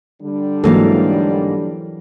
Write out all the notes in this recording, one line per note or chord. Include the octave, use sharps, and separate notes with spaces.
D3 G3 D4
G#2 E3 F#3 A#3 A4 F5